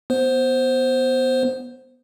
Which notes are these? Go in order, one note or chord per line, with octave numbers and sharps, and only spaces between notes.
B3 C5